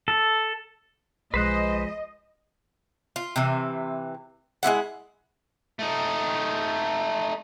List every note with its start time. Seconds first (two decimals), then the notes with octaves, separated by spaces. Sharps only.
0.08 A4
1.34 B1 F3 G#3 B4 C5 D#5 F#6
3.16 F4
3.36 C3 E3
4.63 G#3 B3 E4 F#5
5.79 A3 D#4